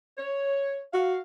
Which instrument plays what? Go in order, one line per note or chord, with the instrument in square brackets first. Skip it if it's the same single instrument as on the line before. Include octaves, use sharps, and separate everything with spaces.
[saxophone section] C#5
[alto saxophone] F#4 [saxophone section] F5